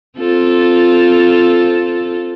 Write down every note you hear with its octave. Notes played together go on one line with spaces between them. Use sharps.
C4 F4 A4